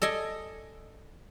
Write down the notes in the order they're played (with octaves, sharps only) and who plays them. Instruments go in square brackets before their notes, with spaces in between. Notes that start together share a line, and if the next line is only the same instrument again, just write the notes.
[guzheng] A4 D5 D#5 G#5